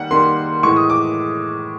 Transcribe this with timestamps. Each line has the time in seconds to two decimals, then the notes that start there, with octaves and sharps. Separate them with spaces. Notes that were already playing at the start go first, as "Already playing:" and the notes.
Already playing: D#3 G3 A#3 F#5
0.11 D#3 G3 A#3 C6
0.63 A2 E3 G#3 C#6
0.76 D#6
0.90 D6